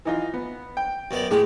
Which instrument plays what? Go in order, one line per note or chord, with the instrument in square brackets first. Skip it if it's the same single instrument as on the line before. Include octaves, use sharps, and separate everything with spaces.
[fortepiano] E3 D#4 F4
B3
G5
[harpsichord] F#2 B3 D5
[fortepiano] A2 [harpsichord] G#3 G4 [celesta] G#4